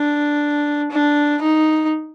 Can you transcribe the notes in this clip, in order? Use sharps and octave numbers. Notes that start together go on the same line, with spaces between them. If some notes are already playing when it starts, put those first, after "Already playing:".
Already playing: D4
D4
D#4